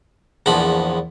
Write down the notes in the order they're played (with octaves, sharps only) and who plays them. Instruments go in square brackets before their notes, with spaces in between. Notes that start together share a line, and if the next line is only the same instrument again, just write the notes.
[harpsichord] A#1 E2 F3 B5